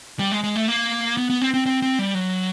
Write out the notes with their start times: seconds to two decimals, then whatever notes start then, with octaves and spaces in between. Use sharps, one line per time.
0.19 G3
0.32 G#3
0.44 G#3
0.56 A3
0.68 A#3
1.17 B3
1.30 B3
1.41 C4
1.54 C4
1.66 C4
1.82 C4
1.99 G3
2.14 F#3